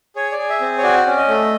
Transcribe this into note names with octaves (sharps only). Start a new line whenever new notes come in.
G#4 C#5
D5
G#4
E5
C4
C#5
F#4 D5
C#4
D#5
A3